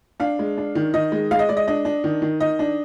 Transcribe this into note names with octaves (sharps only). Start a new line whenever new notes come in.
D4 F5
G#3
D4
D#3
D#3 D#5
G#3
G#3 F5
D#5
G#3 D5
D#5
D4 D#5
D4
D#3
D#3
D#3 D#5
D4